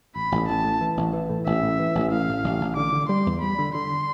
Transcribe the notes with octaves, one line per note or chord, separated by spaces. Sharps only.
A1 B5
A1
A1 A5
A2
E3
A1
E3
A2
A1 E5
A2
E3
A1
A2 F5
A1
A1
A1
D3 D6
D3
G3 C6
E2
G3 B5
D3
D3 C6